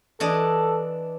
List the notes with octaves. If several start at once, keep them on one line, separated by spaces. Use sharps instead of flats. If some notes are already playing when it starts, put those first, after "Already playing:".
E3 D4 A4 D#5